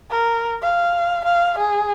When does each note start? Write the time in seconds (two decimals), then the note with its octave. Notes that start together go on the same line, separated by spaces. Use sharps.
0.10 A#4
0.62 F5
1.25 F5
1.59 G#4